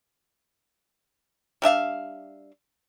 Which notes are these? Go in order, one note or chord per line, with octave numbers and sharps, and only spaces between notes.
G3 D4 E5 F5